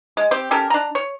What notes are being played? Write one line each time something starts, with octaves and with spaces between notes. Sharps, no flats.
G#3
C4 G4
C#4 G4 A4 A#4
D4 A#5
C#5